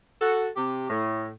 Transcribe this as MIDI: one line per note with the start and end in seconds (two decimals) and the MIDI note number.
0.21 0.48 66
0.21 0.48 69
0.57 0.87 48
0.57 0.87 67
0.89 1.31 45